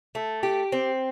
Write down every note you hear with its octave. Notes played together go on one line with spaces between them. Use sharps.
A3
G4
C4